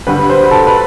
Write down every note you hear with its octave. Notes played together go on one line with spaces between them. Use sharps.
G2 D3 G3 B4
C5
B4
A4
B4